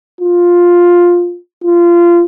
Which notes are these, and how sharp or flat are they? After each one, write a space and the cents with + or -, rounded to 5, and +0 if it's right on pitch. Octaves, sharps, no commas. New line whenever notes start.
F4 +5
F4 -20